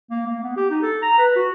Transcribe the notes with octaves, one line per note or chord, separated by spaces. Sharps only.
A#3
A#3
B3
G4
D#4
A4
A#5
B4
F#4